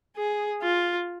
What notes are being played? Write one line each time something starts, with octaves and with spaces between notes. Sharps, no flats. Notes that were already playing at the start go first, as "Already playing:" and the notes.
G#4
F4